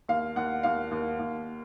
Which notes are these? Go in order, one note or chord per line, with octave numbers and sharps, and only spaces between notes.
D#2 F5
D#2 F#5
D#2 F5
D#2
D#2